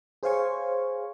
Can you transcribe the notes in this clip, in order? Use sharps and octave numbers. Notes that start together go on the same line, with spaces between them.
G#4 C5 C#5 F5 G#5 C#6